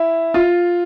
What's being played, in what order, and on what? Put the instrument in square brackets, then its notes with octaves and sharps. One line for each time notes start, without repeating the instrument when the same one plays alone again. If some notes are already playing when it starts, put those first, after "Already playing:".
Already playing: [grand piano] E4
F4